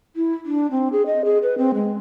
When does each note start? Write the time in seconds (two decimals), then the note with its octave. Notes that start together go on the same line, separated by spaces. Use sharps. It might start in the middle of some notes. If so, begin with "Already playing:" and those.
0.16 E4
0.45 D4
0.71 C4
0.92 G#4
1.06 D#5
1.24 G#4
1.42 B4
1.58 C4
1.74 G#3